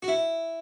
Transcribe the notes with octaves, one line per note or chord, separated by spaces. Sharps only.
F#4
E4